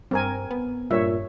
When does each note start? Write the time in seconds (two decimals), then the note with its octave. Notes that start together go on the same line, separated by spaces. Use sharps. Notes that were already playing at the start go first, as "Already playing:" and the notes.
0.11 G2 C4 A#4 G#5
0.51 B3
0.91 G2 A#2 C#5 E5